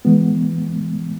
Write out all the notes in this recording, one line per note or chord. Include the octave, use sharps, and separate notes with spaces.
E3 G#3 B3